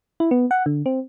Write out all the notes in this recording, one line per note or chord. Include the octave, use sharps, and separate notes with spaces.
E4
B3
F#5
D3
C4